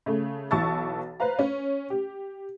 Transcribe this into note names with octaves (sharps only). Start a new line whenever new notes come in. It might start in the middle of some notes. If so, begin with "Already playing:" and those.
C#3 A3
B1 E3 A5 C#6 E6 A6
B4 C5 F5 A#5
C#4
G4